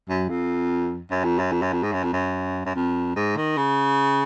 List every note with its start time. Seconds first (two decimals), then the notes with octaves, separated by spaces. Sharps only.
0.09 F#2
0.29 F2
1.11 F#2
1.24 F2
1.39 F#2
1.52 F2
1.62 F#2
1.73 F2
1.83 G#2
1.93 F#2
2.04 F2
2.13 F#2
2.66 F#2
2.75 F2
3.16 G#2
3.37 D#3
3.57 C#3